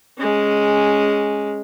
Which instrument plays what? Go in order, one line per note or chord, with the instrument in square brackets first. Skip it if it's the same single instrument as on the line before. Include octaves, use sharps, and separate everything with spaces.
[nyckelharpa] G#3 C#4